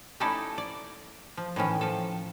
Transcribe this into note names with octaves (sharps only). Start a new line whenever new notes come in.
A3 C#4 D#4 E4 A4 D5
D5
F3
A2 D#3 E3 C#4
F3 A4